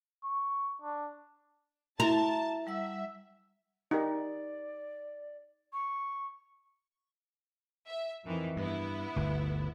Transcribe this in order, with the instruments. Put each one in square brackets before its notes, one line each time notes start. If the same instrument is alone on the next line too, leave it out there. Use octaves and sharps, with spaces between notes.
[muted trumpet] C#6
D4
[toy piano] E4 F#4 [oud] A#4 [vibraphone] E5 A#5 [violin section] A5
[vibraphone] G3 F#5 E6 [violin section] E5
[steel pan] D#4 G4 A#4 [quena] D5
[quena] C#6
[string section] E5
F2 D#3 E3
[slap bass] G2 [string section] B3 E4
[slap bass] G1 D2